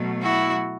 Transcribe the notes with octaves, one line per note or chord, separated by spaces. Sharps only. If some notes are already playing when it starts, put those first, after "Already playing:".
Already playing: B2 F#3 A3
E4 F#4